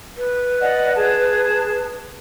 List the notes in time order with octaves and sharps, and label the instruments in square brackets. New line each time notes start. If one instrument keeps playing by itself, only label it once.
[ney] B4
[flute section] D5 D#5 F#5
G#4 A5